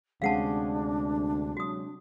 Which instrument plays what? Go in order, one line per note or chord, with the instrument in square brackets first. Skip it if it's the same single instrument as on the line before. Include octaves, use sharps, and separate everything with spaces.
[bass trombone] D2 [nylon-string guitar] C3 G#3 C#4 [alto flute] D4 [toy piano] F5 F#5 A5
[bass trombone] F#3 [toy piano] F#4 D#6